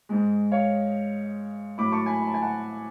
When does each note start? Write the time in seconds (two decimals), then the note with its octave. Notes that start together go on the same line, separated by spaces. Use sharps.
0.09 G#2 G#3
0.52 C#5 F5
1.78 A2 F#3 B5 D6
1.92 A5 C#6
2.06 G#5 B5
2.20 B5
2.27 A5
2.34 G#5
2.42 F#5 A5